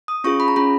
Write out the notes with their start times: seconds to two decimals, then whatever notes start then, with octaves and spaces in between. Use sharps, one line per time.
0.08 D#6
0.24 C#4 F4 G#4 C#6
0.40 B5
0.48 A#5
0.56 C#4 F4 G#4 B5